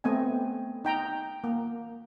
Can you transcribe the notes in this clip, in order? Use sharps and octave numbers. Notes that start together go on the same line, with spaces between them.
A3 B3 C4 D#5 G#5
D#4 G5 A#5
A#3